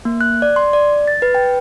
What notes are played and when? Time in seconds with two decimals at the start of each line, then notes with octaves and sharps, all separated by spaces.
0.05 A#3
0.21 F#6
0.42 D5
0.56 C6
0.73 D5
1.08 A6
1.22 B4
1.35 G5